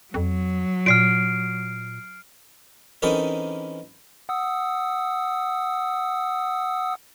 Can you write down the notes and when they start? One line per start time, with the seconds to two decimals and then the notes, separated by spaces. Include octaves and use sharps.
0.14 F2 F#3
0.86 A#2 F6 C7 D7
3.02 E3 C4 C#4 D#4 A4 A#4
4.29 F#5 D#6 E6